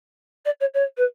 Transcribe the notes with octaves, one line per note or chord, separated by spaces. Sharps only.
D5
C#5
C#5
B4